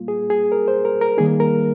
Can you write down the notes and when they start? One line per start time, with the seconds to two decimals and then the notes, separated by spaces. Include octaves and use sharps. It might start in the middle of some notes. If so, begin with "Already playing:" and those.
Already playing: G3 A#3 F4
0.08 G#4
0.30 G#4
0.52 A#4
0.68 C5
0.85 A#4
1.01 A#4
1.17 D#3 G3 A#3 D#4 G#4
1.40 A#4